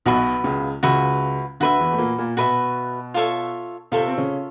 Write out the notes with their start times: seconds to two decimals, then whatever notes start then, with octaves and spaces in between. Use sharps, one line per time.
0.06 B1 B2 F#4 B4 E5
0.44 C#2 C#3
0.83 C#2 C#3 F#4 B4 E5
1.60 D2 D3 F#4 B4 E5
1.79 E2 E3
1.93 A3
1.98 A#2 A#3
2.18 A#2 A#3
2.37 B2 B3 F#4 B4 E5
3.14 F4 A4 C#5 E5
3.92 C3 C4 F4 A4 C#5 E5
4.08 C4
4.18 C#3 C#4